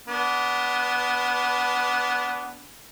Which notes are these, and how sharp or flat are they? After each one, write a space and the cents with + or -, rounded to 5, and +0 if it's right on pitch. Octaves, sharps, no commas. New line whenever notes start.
B3 +0 D4 -25